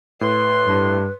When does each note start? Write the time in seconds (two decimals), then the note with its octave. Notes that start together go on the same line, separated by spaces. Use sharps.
0.21 A2 B4 C6
0.68 G2